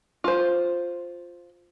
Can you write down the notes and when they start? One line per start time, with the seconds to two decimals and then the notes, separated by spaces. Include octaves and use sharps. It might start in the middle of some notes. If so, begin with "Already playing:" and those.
0.24 F4 C5